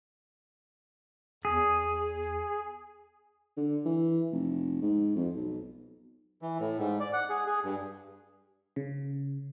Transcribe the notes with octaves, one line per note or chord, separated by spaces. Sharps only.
E2 G#4
D3
E3
F1
G#2
F2
B1
E3
A2
G#2
D5
F#5
G#4
G#4
G2
C#3